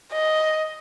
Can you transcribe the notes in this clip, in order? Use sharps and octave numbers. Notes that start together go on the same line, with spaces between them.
D#5